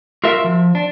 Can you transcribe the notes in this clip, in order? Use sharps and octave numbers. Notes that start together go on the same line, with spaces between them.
F4 F#4 A#4 E5
F3
D4